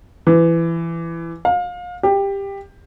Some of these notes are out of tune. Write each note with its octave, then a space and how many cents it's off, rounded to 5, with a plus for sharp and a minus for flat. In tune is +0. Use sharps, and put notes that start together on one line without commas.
E3 +20
F5 +30
G4 +15